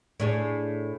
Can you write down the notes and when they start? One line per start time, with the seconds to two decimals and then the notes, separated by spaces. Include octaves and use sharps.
0.20 A2 D4 G#4